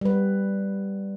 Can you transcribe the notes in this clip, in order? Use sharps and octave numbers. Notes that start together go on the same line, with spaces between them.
G3 B4